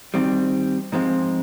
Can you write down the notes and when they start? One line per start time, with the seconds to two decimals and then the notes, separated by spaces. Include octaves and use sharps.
0.14 D#3 G3 C4
0.92 G#2 F3 G#3 C4